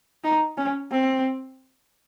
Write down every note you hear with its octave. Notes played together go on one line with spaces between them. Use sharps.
D#4
C#4
C4